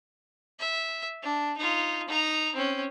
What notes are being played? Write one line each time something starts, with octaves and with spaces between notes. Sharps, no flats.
E5
D4
D#4 F4
D#4 A#5
C4 C#4